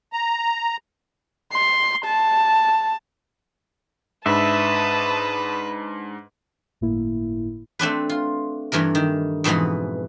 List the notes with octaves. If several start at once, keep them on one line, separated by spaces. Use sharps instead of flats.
A#5
C6
A5
G#2 D4 B4 E5 A5 D#6
G1 A2 A#3 E4
A3 C4 D4 B4
F4
G2 E3 A3 A#4
D#3
F2 G#2 B2 E3 B3